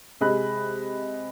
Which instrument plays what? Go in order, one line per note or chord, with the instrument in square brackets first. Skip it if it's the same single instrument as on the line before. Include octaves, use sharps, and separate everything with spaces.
[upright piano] C3 G#3 D#5 B5 F#6